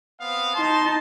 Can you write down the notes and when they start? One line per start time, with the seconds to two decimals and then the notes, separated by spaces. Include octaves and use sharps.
0.20 B3 C4 F5
0.55 D#4 A5 C6